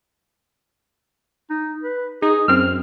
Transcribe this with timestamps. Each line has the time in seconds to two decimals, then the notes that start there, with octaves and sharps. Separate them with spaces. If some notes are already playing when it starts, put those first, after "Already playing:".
1.50 D#4
1.83 B4
2.22 D#4 G#4
2.48 F#2 C4 F6